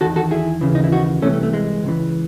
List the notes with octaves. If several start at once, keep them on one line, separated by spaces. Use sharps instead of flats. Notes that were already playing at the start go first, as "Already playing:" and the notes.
E2 D#3 F#4 A4
F#4 A4
E4 G#4
D#2 C#3 E3
D#4
E4
D#4 F#4
C2 C3 E3 A3 C#4
A3
A3
G#3
C#2 C#3 E3